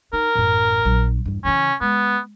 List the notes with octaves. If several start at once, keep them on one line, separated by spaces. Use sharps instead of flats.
D#4 A#4
A1 F#2
A#1 F#3
E2 G2
C#3 E3 C#4
G#3 B3